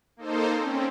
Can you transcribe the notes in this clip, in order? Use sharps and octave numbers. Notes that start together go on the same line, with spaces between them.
A#3 D#4 A4 C5
C4 C#4